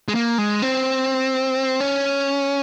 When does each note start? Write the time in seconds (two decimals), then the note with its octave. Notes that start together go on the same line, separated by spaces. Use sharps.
0.08 G#3
0.15 A#3
0.38 G#3
0.62 C4
1.80 C#4